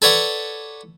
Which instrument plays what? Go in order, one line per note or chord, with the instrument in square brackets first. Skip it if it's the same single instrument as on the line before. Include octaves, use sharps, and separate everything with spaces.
[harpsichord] A4 B4 C#5 D5 F#5